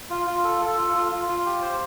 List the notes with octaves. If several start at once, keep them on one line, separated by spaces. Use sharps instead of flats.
F4
F4
A4
A4
F4
F4
F4
F4
G4
C5